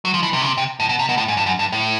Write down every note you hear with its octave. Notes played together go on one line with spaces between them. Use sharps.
F#3
F3
E3
C3
C#3
C3
C3
A2
B2
C3
B2
A2
G#2
G2
F#2
G2
A2